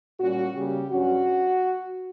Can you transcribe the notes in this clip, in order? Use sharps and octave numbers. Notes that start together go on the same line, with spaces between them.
A#2 G3 C#4 F#4
C#3 G3 A#3 G4
G2 F#3 C#4 F#4